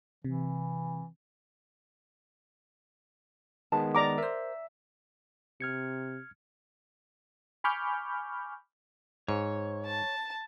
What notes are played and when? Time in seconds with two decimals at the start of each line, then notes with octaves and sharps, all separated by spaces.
0.24 C3 E3
3.72 D#3 G#3 B3 A5
3.95 D5 A#5 D6
4.18 A#4 C5 E5
5.60 C3 F6 G#6 C#7
7.64 G#5 B5 C#6 D6 F6 G6
9.28 G#2 C#5
9.86 A5